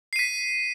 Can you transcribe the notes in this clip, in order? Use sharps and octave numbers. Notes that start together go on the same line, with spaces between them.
B6 C7 D#7